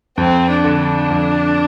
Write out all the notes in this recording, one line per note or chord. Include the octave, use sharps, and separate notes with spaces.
F2 C4
D4
D3
D4
F2